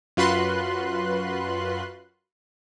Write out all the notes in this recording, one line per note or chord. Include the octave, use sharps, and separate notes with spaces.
F#2 F4 F#4 B4 C6 F#6